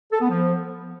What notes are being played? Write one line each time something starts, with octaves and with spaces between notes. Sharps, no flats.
A4
B3
F3